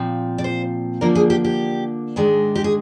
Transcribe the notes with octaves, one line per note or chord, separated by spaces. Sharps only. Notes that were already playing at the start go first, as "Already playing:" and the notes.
Already playing: A#2 F3 C4
D5
C5
D3 F3 A#3 D4 A#4
G#4
G4
G4
G#2 D#3 G#3 D4
G4
G#4